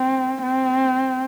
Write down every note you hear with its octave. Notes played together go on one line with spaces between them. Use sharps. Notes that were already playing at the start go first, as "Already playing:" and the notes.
Already playing: C4
C4